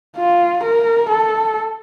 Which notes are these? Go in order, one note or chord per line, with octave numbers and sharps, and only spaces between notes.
F4
A#4
A4